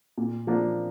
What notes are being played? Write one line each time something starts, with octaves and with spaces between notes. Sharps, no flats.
A#2
F3 A#3 D4